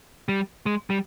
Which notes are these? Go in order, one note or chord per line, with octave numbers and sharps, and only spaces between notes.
G3
G#3
G3